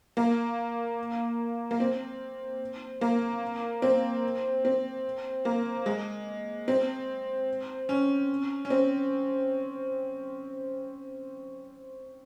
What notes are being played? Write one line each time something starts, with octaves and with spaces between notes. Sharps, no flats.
A#3
A#3
C4
A#3
C4
C4
A#3
G#3
C4
C#4
C#4
C4